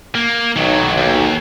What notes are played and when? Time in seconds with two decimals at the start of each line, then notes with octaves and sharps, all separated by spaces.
0.15 A#3
0.56 B1 D#3 F#3
0.97 D#2